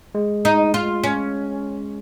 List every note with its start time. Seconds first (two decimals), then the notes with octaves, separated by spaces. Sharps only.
0.15 G#3
0.45 D#4
0.74 F4
1.04 C#4